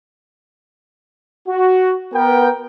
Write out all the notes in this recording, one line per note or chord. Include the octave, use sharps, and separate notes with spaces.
F#4
B3 A#4 G5